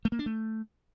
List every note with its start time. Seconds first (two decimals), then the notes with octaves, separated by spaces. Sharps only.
0.05 A3
0.12 A#3
0.19 D4
0.26 A3